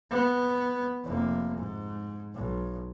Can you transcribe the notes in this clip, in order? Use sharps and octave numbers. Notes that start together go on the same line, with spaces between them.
B3
F1 A#3
G#2
B1